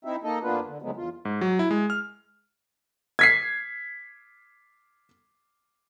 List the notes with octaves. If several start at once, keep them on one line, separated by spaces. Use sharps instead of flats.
C4 D#4 E4 E5
A#3 D#4 A4 D#5
F2 A#3 B3 D4 F4 B4
D3
C#3 F3 F#3 G#3 A3 B3
E2 F4
G#2
F#3
E4
G#3
F6
G#6 B6 C7